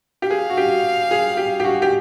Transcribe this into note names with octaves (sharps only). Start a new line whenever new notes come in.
G4
G#4 F5
F#4
G4
G#4
G4
G4
F#4
G4